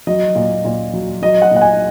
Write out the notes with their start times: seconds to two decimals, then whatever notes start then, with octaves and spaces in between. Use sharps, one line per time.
0.07 F#3 D#5
0.35 A#2
0.65 A#2
0.93 F#3
1.22 F#3 D#5
1.42 F#5
1.51 A#2
1.56 F#5
1.61 G#5